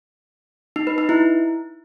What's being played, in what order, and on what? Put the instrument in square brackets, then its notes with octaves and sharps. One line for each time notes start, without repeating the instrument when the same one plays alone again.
[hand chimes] D#4
B4
D#4
E4